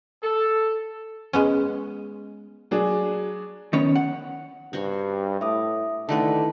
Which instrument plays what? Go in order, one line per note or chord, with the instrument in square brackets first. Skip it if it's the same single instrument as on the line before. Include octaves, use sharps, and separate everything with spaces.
[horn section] A4
[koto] G#3 B3 C#4
[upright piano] F#3 D4 G#4
[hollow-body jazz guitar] D#3 B3 C#4 C#5
F#5
[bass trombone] G2 [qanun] F#4 C5 C#5
[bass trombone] A2 [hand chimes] E5 D6 D#6
[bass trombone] D3 [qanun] D#3 A3 B4 [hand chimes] E4 A5